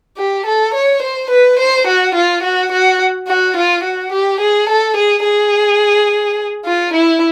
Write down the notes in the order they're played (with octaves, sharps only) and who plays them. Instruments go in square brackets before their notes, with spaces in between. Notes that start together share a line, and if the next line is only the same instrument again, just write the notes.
[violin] G4
A4
C#5
C5
B4
C5
F#4
F4
F#4
F#4
F#4
F4
F#4
G4
G#4
A4
G#4
G#4
F4
E4